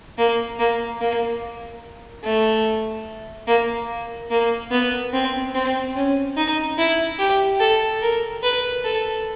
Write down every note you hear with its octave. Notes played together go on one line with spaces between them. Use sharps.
A#3
A#3
A#3
A3
A#3
A#3
B3
C4
C4
C#4
D#4
E4
G4
A4
A#4
B4
A4